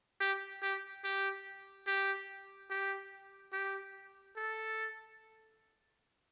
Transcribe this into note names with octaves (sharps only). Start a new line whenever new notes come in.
G4
G4
G4
G4
G4
G4
A4